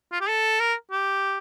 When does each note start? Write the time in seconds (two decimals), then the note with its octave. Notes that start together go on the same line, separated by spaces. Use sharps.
0.12 F4
0.21 G4
0.28 A4
0.60 A#4
0.91 G4